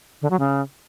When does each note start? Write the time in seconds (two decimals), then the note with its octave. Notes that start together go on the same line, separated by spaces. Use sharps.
0.22 D3
0.31 F#3
0.39 C#3